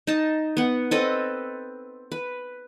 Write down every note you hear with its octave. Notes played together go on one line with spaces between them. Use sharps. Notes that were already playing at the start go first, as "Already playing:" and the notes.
D#4 A5
B3 F#5
C4 A4 B4 D#5
B4